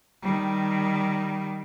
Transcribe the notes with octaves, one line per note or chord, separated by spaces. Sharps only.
D#3 G3